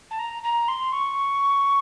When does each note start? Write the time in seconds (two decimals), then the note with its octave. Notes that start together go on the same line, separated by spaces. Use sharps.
0.11 A5
0.19 A#5
0.43 A#5
0.68 C6
0.92 C#6